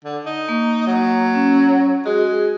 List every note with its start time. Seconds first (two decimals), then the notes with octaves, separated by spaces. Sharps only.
0.05 D3
0.26 D#4
0.49 A#3
0.87 F#3
1.35 C#4
2.06 G#3 F#4 G#4